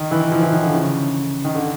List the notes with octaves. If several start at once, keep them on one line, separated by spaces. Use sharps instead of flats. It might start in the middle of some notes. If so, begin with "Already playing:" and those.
Already playing: D#3
E3
F3
E3
D#3
D3
C#3
D#3
D3